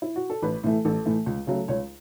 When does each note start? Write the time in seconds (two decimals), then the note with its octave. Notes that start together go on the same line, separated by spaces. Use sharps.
0.02 E4
0.16 F#4
0.30 A4
0.42 A1 B4
0.63 A2 E3 A3
0.85 A1 A4
1.06 A2 E3 A3
1.26 C#2
1.47 C#3 F#3 A3
1.68 C#2 C#5